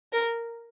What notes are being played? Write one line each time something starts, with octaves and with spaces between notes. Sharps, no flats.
A#4